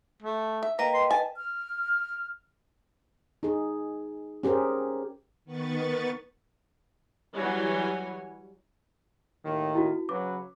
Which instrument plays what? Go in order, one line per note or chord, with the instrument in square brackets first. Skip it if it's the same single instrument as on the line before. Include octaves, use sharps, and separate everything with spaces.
[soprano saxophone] A3
[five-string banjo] E5
[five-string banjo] A#3 [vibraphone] B4 D#5 G5 [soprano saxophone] A#5
[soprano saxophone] C6
[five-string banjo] G#5 [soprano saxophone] A5
[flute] F6
[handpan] D#4 G#4
C#4 G4 G#4 A#4 C5
[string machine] D#3 B3 B4 C#6 A6
[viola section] E3 F#3 G3 F#4 C#5 G#5
[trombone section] D#2 A2 D#3
[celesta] E4 F#4
[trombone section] C#3 F#3 B4 [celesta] D6